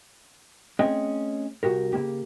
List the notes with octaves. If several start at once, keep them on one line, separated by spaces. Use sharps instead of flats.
A3 C4 C#4 G#4 D#5 G5
C2 F#4 G4 A#4
C#3 E3 A#3 G4